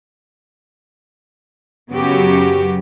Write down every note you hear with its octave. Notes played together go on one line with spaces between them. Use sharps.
F#2 C#3 F#3 B3 F#4 G4